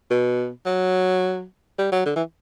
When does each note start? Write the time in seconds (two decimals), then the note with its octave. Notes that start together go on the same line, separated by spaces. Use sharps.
0.10 B2
0.66 F#3
1.79 G3
1.92 F#3
2.06 D3
2.16 E3